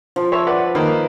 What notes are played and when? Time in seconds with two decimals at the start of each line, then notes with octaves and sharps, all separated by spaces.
0.16 F3
0.32 C#5 E5
0.47 B4 D5 F#5
0.75 D#3 A#3 B4